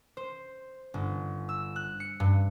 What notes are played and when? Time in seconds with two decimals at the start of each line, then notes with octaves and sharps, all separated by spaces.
0.17 C5
0.94 G1
1.49 E6
1.76 F#6
2.00 C#7
2.20 G2